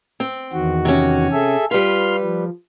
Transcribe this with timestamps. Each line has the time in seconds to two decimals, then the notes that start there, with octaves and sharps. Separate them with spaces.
0.20 C4
0.53 E2 D#3 F#4
0.85 C3 C#4
1.32 G#4 A4 E5
1.71 G3 F4 B4 C6 F6
2.21 F3